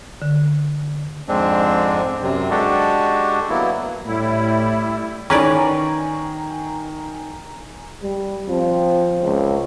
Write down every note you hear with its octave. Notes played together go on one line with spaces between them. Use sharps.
D3
F2 G#2 G#3 C4 D4
F#2 C3
G#3 D4 F#4 G4 A4
F#3 A#3 B3 E4
A2 G3 E4
D#3 C#4 B4 D5 G#5 A#5 C#6
G3
F3 C4
C#2